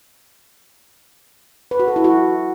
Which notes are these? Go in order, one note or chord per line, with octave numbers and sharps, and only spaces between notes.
B4
F#4
A4
E4
F#4